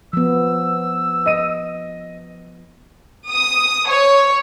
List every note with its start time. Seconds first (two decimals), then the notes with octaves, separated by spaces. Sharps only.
0.13 F3 B3 E6
1.26 D#5 D#7
3.27 D#6
3.88 C#5